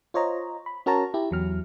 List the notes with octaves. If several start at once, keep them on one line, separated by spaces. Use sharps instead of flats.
F4 C5 C#5 D#5 A#5
B5
C#4 F#4 A#4 C#5 A5 A#5
E4 G4
E2 F#3 F6